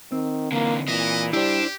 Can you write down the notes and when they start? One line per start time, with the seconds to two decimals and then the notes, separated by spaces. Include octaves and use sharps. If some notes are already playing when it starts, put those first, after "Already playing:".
0.12 D#3 C4
0.52 D3 E3 A#3
0.88 A#2 E3 D#5
1.33 G3 D4 E4 G4 C5